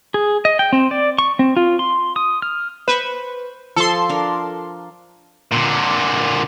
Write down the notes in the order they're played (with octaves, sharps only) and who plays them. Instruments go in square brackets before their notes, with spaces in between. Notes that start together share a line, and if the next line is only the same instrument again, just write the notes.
[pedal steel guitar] G#4
D#5
G5
C4
D5
C#6
C4
F4
C6
D#6
F6
[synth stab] B4 [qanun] C5 C#6
[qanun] F3 [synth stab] A4 C6
[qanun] D4 A#4
[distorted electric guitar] A#2 D3